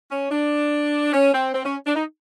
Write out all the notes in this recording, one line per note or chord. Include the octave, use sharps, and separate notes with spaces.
C#4
D4
C#4
C4
C4
C#4
D4
D#4